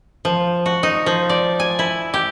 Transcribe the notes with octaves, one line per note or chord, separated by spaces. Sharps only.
F3
F#4
D#4
F3
D5
G#5
E4
G4